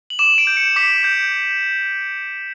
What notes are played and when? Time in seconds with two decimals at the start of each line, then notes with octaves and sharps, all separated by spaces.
0.10 F#7
0.19 D6 E7
0.38 D7
0.47 G6
0.57 C#7
0.76 D6 B6
1.04 G6